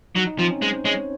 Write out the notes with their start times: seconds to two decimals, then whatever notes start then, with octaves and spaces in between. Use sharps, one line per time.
0.15 F#3 D#4
0.27 D#4
0.39 F3 C4
0.50 C#4
0.62 G#3 C5
0.73 C5
0.84 G#3 C#5